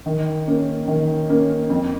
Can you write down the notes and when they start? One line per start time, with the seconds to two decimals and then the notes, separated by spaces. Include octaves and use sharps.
0.06 D#3
0.47 A#3 C#4
0.88 D#3
1.29 A#3 C#4
1.70 F2